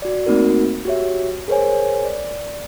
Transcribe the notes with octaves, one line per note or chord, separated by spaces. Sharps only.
F#4 D5
A3 A#3 C4 D#4 F#4 A#4
F#4 G4 C#5 E5
G#4 A#4 C5 C#5 G#5
D5